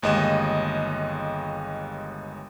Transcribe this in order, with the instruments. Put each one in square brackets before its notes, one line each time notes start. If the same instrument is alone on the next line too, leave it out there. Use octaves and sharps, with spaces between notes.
[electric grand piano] G1 D#2 G#3 D#5 E7